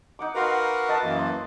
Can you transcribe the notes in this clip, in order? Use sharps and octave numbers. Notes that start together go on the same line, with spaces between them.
D#4 F#5 D6
F#4 A#4 B4 F5 F#5 C6
D#5 E5 A5
F#2 E3 A#3
C6